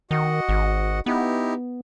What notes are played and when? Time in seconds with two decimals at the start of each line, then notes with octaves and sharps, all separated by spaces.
0.11 D#3 F#4 D#5 F#5
0.49 G#1
1.06 B3 D#4 E4 G4